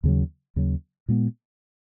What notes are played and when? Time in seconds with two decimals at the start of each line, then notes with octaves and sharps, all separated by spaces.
0.03 D#2 C#3 F#3
0.56 D#2 C#3 F#3
1.08 A#2 G#3 B3